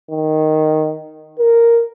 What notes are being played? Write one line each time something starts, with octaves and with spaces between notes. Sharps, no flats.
D#3
A#4